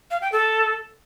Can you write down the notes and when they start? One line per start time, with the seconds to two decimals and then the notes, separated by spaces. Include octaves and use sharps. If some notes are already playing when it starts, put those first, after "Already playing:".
0.11 F5
0.21 G5
0.32 A4